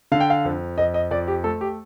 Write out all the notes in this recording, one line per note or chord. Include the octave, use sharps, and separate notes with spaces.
D3 F5
G5
F5
F2
F2 D#5
D#5
F2 D5
G4
A3 A4
G4